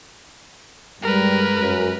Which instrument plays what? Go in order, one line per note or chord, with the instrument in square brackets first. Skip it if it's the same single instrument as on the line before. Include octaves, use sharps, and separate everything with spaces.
[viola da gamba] G2 G#3 [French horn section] G3 [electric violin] A#4 B4
[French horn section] F#2